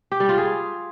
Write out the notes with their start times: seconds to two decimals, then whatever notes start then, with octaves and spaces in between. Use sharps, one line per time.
0.12 G4
0.20 G3
0.29 F4
0.38 G#4